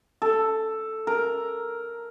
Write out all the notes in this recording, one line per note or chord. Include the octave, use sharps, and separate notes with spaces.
A4
A#4